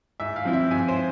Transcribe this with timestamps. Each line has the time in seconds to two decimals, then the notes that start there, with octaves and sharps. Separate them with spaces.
0.20 G#2 E5
0.36 F5
0.45 F3 C4 E4
0.53 E5
0.71 G#2 G#5
0.88 C5